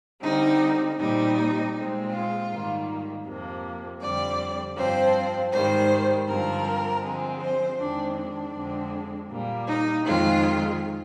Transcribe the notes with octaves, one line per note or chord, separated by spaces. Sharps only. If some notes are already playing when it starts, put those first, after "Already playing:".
D3 G3 C4 D#4
A#2 G3 C4 D#4
A#2 G#3 C4
F4
G#2 D#3 G3 A#3
F2 C3 F3 A#3
F2 D3 G3 C4 D5
G2 F3 C4 C5
G#2 D#3 G3 C5
G2 D3 F3 C4 A#4
D3 F3 G#3 C4
C5
F2 D#3 G#3 C4 D4
D4
F2 D3 G#3 C4
A#2 G3 A#3
D#4
F2 D#3 G#3 C4 F4